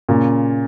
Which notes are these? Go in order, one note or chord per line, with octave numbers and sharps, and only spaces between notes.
A#2 C#3